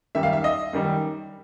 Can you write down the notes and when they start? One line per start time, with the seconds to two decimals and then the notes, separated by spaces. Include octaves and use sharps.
0.15 F#2 D#3 G3 E5
0.23 F5
0.33 E5
0.44 D#5
0.73 F#2 D#3 G3